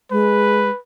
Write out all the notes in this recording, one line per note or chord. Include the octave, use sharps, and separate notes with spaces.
G#3 B4